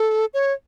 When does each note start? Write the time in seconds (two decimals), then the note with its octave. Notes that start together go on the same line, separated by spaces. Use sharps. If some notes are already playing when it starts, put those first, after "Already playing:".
Already playing: A4
0.34 C#5